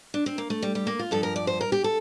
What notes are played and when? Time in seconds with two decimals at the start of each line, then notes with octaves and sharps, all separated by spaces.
0.14 D4
0.26 C4
0.38 A#3
0.50 A3
0.62 G3
0.75 G3
0.87 A#3
0.99 F4
1.11 G2 F3 A4
1.23 A#4
1.36 D5
1.47 C5
1.61 A#4
1.72 G4
1.84 A4